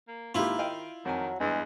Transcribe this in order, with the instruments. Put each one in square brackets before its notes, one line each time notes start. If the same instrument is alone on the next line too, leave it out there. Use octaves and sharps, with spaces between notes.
[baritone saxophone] A#3
[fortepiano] G#2 A#3 G4 [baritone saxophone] D#3 [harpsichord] E4 F4
[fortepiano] D#5 F5 G5
[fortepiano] F2 G#5 [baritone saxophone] D#3 [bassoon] F#3
[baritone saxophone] E2 [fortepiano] G2 [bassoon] G#3